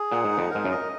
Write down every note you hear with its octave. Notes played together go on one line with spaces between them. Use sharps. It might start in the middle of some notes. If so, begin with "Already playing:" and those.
Already playing: G#4
A#2 F#5
G#2
D#4
F2
G#2 A#4
F#2
D#5